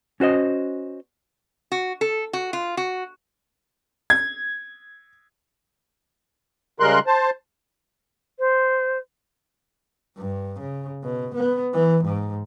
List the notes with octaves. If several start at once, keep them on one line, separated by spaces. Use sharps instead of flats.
C#4 F#4 C5 D#5
F#4
A4
F#4
F4
F#4
G#6
C#3 G3 G#3 A#4 C6 F#6
C5 A5
C5
G2
C#3
B2
B3
E3
G#2